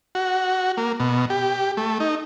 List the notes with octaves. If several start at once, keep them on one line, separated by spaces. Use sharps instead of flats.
F#4
A#3
B2
G4
A3
D#4